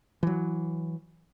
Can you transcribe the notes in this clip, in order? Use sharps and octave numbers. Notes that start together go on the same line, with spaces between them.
E3 F#3